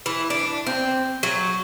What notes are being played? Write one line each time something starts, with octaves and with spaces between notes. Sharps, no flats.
E3
D4
C4
F#3